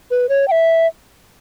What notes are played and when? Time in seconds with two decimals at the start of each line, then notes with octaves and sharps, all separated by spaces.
0.11 B4
0.29 C#5
0.48 G5
0.51 E5